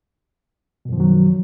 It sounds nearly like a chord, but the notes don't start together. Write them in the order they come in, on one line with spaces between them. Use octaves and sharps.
B2 F#2 F3 D#3 F#3